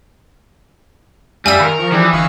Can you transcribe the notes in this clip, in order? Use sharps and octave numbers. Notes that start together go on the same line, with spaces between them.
F#2 G3 E5 F5 G#5 E6
D#3 A#4 B4
F3 C#6
E3 D4 G4 G#4
G1 D#5 F5 C#6